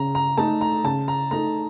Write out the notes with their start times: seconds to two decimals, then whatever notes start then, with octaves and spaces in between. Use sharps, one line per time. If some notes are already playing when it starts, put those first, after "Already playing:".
Already playing: C#3 A#5
0.15 A#5
0.38 A3 D#4 A4 A5
0.61 A#5
0.84 C#3 A5
1.08 A#5
1.31 A3 D#4 A4 A#5